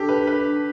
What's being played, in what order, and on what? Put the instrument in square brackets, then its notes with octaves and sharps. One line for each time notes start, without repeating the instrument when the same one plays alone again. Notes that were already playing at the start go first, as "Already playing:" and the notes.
Already playing: [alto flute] D4 [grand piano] G4 A4
[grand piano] B4
B4